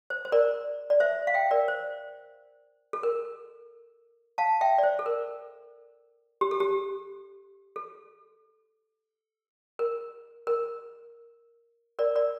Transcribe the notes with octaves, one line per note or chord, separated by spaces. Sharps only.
C5
C5
A#4 D5
D5
C5 E5
F5
E5 G5
A#4 D5
C5
A4
A#4
F5 A5
E5 G5
D5
C5
A4
A#4
G4
A4
G4
A4
A#4
A#4
A#4 D5
A#4 D5